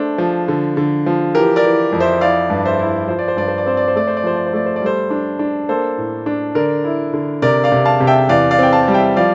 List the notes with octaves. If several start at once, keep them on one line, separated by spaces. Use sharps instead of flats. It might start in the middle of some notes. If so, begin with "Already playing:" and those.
Already playing: A3 D4 A4 C5
F3
D3
D3
F3
E3 G4 A#4
A#4 D5
E3
F2
C5 E5
E4 D5 F5
G2
C5 E5
E4
F3 C5
D5
C5
G2 D5
C5
D5
C4 C5
D5
C5
A3 D5
C5
D5
F3 C5
D5
C5
A3 D5
C5
D5
G3 A4 C5
D4
D4
A#3 A4 C5
A2
D4
D3 A#4 D5
E4
D3
C3 A#4 D5
D5 F5
C3
F5 A5
C3
E5 G5
E2 D5 F5
D5 F5
C4 G5
F5 A5
G3
E5 G5
F3 D5 F5